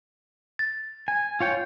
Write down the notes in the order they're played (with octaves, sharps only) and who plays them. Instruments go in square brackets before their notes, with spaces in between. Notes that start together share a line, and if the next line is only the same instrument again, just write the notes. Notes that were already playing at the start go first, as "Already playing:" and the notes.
[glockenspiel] A6
[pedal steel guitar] G#5
F4 C#5 G5